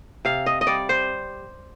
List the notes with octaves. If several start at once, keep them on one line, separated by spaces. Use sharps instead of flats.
C3 F5
D#5
D#5
G3 D5
C5